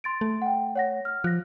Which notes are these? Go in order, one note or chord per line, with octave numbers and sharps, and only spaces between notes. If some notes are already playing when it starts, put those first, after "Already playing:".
C6 A6 D7
A3
F#5 G5
C#5 F#5 A#6
F6
F3 F#6 A#6